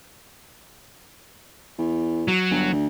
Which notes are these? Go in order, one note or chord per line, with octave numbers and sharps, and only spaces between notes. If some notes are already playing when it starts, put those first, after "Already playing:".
E2
F#3
G1
D2